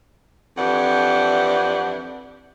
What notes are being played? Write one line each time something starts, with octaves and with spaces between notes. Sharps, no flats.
F2 E3 D4 G4 F#5